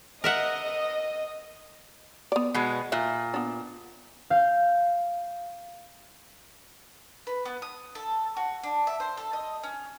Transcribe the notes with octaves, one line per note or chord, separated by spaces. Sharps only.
A#4 D#5 E5 F#5
B3 D5
B2 G#3
A#2 E5
B3 D4
F5 G6
B4
B3
D#6
A4
F#4
D4
E5
C5
A4
D#5
C#4